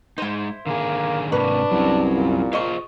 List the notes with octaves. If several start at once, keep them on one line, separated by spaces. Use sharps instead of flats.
G#3 D#4 E4 C5
D3 D#3 A#3 G#4
G#2 C3 A#3 D4 B4 C#6
C2 F#3 C#4
A#2
F4 G#4 C5 D#5 C#6